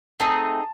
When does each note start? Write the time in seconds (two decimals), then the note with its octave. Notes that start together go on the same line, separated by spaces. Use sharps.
0.20 A3 C4 D#4 G#4 A5